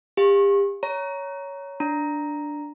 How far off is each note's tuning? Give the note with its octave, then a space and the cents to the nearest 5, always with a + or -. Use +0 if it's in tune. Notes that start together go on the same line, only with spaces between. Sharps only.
G4 +35 F5 +0 C#6 -35
C#5 +10 A#5 +5
D4 +0 A#5 +0